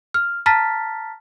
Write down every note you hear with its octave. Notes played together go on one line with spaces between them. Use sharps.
F6
A5 A#5 F6 A6 B6